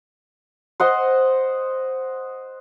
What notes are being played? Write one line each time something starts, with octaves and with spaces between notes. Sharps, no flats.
C5 D#5 F#5 C6